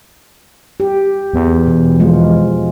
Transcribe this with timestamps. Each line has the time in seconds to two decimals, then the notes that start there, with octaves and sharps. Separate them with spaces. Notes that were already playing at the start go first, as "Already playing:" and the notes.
0.80 G4
1.33 E2
1.67 B2
2.00 F3 G#3 F4